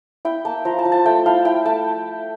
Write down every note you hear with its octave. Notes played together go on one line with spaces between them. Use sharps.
E4 G5
A#3 A5
F3 A#5
A5
F3
A5
A3 G5
E4 F5
E4 G5
A3 A5